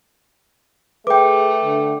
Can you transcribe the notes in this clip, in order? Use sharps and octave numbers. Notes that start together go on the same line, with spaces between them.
A3 G#4 B4 G5 D6
D3